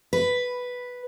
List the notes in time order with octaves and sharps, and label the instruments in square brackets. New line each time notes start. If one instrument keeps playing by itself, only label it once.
[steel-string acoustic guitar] B4